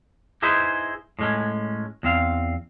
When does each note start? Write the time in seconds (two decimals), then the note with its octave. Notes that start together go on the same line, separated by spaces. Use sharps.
0.42 D#4 E4 G#4 B4 C5
1.19 A2 G#3 C#4
2.03 E2 C4 F5